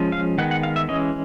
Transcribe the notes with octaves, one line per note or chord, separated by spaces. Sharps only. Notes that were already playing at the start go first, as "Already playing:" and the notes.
Already playing: F3 G#3 C#4
F5
D#3 G#3 B3 F#5
F#5
F5
E5
E3 G#3 C#4 D#5